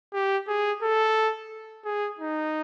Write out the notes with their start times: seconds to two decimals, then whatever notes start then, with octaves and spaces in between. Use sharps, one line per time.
0.14 G4
0.48 G#4
0.83 A4
1.85 G#4
2.19 D#4